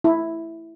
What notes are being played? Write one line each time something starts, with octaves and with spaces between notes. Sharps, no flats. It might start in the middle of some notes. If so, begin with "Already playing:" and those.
E4